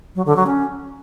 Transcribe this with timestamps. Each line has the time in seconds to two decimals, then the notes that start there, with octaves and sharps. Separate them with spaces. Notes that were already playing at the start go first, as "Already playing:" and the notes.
0.15 F#3
0.26 D3
0.36 F#3
0.47 C#4